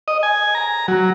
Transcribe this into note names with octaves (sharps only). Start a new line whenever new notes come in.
D#5
G#5
A#5
F#3